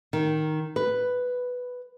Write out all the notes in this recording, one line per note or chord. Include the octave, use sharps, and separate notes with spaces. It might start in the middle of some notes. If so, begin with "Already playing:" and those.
D#3
B4